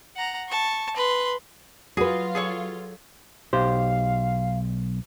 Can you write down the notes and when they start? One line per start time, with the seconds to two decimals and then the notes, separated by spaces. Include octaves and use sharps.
0.16 F#5 A#5
0.49 A5 C#6
0.97 B4 C6
1.97 F#3 F4 F#4 G#4 B4
2.35 G#4 A4 C#5
3.53 B1 G4 C5 F5